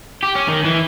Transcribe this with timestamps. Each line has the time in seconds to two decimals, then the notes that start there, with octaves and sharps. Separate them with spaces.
0.23 G4
0.35 C#4
0.48 D#3
0.64 E3